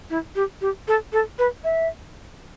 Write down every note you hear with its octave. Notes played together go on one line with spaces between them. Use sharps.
E4
G4
G4
A4
A4
B4
E5